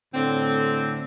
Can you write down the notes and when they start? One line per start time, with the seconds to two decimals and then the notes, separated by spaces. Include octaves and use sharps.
0.14 A2 D3 C4